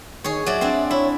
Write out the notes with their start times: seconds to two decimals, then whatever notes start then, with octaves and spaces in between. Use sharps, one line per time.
0.24 D#3 G#4 C#5
0.46 F#3 D5 E5
0.61 C4 D4
0.91 E4 C#5